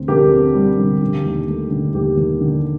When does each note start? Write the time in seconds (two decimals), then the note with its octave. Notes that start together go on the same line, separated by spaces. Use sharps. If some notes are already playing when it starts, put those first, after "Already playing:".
Already playing: D2 C4
0.08 D3 G4 A#4
0.31 C4
0.54 G3
0.78 D3
1.02 D3
1.25 D#2
1.48 A3
1.71 D3
1.94 D#2 G4
2.17 D#2
2.41 D3